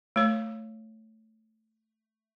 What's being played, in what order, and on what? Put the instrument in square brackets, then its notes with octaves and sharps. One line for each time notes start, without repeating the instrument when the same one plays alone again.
[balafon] A3 C#5